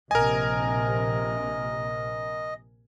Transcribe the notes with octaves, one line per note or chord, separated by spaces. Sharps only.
A#1 C3 A#4 D#5 G#5